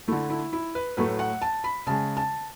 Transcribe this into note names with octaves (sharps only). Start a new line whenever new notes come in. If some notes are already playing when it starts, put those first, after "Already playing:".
D3 A3 E4
E4
E4
B4
A2 F#3 A3 B4
F#5
A5
B5
C#3 G#3 A5
A5